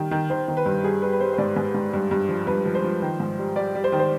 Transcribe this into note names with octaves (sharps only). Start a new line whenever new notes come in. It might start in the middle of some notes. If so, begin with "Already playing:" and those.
Already playing: D#3 G3
D#3
D#3 C5
D#3
B4
G2
G3 G#4
G3 B4
B4
G3 C5
C5
G#2 D5
G#2
G#2
G2
G2
F3
G2 B4
F3
C5
F3
D#3
G#2
G3
G3 D5
G3
C5
D#3
C5